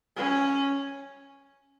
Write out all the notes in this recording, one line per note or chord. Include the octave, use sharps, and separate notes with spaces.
C#4